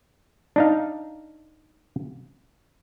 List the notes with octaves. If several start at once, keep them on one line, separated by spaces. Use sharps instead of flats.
D4 D#4 F5